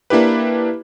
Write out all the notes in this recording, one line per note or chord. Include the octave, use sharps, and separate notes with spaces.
A#3 D4 E4 G4 B4